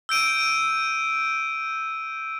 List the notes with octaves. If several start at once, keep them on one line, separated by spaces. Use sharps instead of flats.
E6 G6 D7 D#7